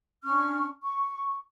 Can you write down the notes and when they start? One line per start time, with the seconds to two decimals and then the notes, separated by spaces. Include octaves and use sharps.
0.24 C#4 D4 C#6 F6
0.81 C#6